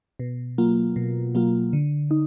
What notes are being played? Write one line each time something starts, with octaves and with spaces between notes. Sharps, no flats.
B2
F#3 A#3 F4
B2
F#3 A#3 F4
D3
D#4